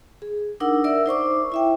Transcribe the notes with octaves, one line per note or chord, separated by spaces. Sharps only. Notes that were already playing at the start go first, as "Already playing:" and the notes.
G#4
D4 D#4 A#4 F#5 E6
A#4 D5 E5 E6
D#4 C5 C#6 D6
E4 E5 G5